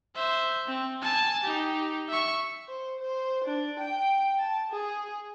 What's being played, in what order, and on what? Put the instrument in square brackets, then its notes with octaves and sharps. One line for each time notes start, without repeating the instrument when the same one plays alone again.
[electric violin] C5 E5
C4
G#5 A5
D#4 G4
E5 C#6
[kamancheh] C5
C5
D4
G5
A5
G#4